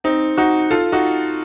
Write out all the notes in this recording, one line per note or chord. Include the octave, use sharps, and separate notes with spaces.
C4 D#4
D#4 F#4
F4 A4
D#4 F#4